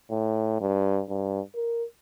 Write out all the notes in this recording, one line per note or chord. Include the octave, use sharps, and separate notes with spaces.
A2
G2
G2
A#4